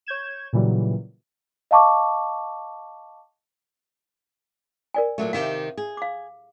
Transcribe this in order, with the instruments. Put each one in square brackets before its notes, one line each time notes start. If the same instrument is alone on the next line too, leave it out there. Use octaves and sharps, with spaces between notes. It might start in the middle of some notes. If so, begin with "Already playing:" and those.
[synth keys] C#5 G6 G#6 E7
A#2 C#3 E3 F#3 G3
[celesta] D#5 F5 A5 C#6 D6
[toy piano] A#4 D5 G#5
[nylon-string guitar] A#2 F#3 A3
[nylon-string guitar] C3 D#3 G4 [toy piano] F5
[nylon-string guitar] G#4
[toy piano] F5 D6